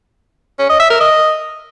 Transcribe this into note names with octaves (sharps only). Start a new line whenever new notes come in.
C#4
D#5
E5
A#4
D#5